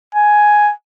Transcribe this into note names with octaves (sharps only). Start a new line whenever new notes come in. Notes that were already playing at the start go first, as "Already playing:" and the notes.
G#5